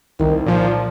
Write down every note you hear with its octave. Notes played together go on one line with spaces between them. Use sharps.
C2 D#3
A#2 F3